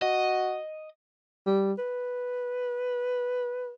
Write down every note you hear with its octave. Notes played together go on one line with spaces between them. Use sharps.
F#4 D#5
G3
B4